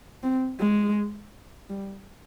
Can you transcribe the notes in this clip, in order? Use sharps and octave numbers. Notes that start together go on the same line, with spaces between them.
C4
G#3
G3